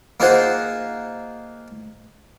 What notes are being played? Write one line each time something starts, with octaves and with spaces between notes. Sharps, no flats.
A#3 D#4 F4 G#4 C5 F#5